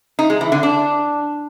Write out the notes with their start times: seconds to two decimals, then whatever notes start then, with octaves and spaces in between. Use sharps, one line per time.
0.19 D#4
0.30 G#3
0.41 E3
0.52 D3
0.63 D4